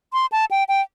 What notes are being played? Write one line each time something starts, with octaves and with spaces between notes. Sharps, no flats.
C6
A5
G5
G5